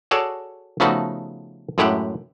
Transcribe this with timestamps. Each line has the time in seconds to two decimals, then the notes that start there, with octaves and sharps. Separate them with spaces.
0.11 F#4 G#4 A4 C#5 D5
0.80 C#3 F3 A3 B3 D#4 F#4
1.78 F#2 A2 G#3 E4 G4 F#5